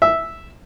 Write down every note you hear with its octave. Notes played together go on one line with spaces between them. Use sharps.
E5